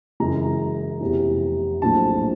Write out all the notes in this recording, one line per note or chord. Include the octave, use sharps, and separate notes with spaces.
F#2 C#3 E3 G#3 A#5
F1 E2 C3 E3
A#1 A2 F#3 A3 A5